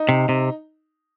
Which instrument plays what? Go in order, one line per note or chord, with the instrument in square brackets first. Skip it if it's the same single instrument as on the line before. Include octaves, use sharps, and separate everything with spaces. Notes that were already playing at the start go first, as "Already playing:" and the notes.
Already playing: [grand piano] D#4
[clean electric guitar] C3
C3